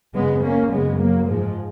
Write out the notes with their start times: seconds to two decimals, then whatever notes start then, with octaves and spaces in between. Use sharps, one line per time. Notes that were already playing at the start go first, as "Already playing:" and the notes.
0.14 F#2 C#3 G#3 B3
0.42 A#3 C#4
0.71 F#2 C#3 G#3 B3
0.99 F#3 A#3
1.27 G#2 F3 G#3